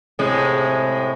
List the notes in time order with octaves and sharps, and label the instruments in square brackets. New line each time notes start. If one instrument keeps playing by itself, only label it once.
[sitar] A2 C3 G#3